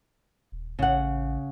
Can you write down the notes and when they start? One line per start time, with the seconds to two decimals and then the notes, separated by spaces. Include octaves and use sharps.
0.52 D#1
0.79 A1 C#3 F#5